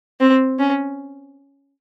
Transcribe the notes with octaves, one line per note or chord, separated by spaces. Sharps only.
C4
C#4